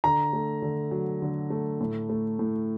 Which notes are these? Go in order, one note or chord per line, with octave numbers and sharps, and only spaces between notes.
D3 A#5
A3
D3
F#3
D3
A3
A2
A3
A2